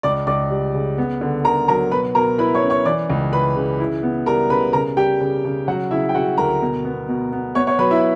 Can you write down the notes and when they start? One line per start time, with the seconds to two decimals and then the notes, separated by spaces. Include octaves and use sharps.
0.03 C#2 D5 D6
0.27 C#2 D5 D6
0.51 G3
0.74 C#3
0.98 B3
1.21 D3
1.44 D3 A#4 A#5
1.68 F#3 A#4 A#5
1.92 B2 B4 B5
2.15 B2 A#4 A#5
2.38 E4 B4 B5
2.55 C#5 C#6
2.62 C#4
2.70 C#5 C#6
2.85 E3 D5 D6
3.10 C#2
3.33 E3 B4 B5
3.56 C#3
3.80 E4
4.03 B3
4.26 G3 A#4 A#5
4.50 C#3 B4 B5
4.73 C#3 A#4 A#5
4.97 G3 G4 G5
5.21 C#3
5.45 C#3
5.68 F#3 F#4 F#5
5.91 C#3 E4 E5
6.09 G5
6.14 C#3 F#4 F#5
6.38 D2 A#4 A#5
6.62 B2
6.85 B3
7.08 B2
7.32 B3
7.55 B3 C#5 C#6
7.67 C#5 C#6
7.79 F#3 B4 B5
7.91 E4 E5